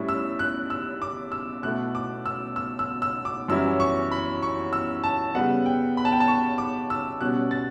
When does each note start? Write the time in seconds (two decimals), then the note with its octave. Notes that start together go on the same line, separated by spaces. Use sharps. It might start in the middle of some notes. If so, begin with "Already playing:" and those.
Already playing: A2 G3 C#4 E4
0.09 E6
0.39 F#6
0.70 E6
1.02 D6
1.32 E6
1.63 B2 A3 E4 F#6
1.95 D6
2.26 E6
2.56 E6
2.79 E6
3.02 E6
3.25 D6
3.48 F#2 E3 G3 C#4 E4 E6
3.80 C#6
4.12 B5
4.43 C#6
4.73 E6
5.04 A5
5.35 C#3 G3 B3 F#5
5.66 G5
5.97 B5
6.05 A5
6.12 G5
6.20 A5
6.28 C#6
6.58 D6
6.90 E6
7.21 B2 G3 C#4 F#6
7.51 A6